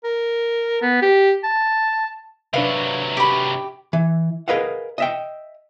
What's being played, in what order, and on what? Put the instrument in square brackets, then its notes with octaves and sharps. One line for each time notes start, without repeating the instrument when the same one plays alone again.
[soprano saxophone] A#4
B3
G4
A5
[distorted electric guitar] C3 F#3 [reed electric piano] D4 B4 E5 [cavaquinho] F5
[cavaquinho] G4 B5
[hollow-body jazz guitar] E3
G#4 A#4 B4 D#5 F5 F#5
D#5 E5 G5